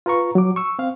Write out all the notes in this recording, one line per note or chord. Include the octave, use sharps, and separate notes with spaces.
F4 B4 A#5 C#6
F#3 D6
C#6 E6
C4 F5